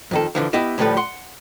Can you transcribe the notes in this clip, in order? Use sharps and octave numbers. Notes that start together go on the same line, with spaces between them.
F2 D#3 A4
D3 E3 F3
B3 E4 G4 D#5 E5
D2 A2 F3 G3 A4 B4
F#5 C6